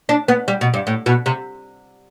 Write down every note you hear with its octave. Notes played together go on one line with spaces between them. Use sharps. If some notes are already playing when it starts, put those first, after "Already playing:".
D4
B3
G3
B2
G2
A2
B2
C3